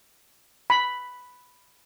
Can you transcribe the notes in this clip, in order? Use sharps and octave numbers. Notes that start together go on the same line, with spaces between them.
B5